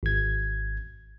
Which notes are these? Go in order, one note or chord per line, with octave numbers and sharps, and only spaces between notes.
G#1 G#6